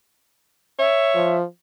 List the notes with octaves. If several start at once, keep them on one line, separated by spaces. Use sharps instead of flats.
C#5 E5
F3